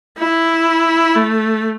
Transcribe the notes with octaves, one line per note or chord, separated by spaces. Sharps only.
E4
A3